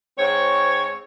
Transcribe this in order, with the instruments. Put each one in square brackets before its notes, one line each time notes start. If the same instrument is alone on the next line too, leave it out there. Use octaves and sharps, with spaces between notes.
[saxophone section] G#2 C4 C#5